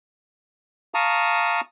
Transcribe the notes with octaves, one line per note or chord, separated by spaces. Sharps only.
F5 A5 A#5 C#6 D#6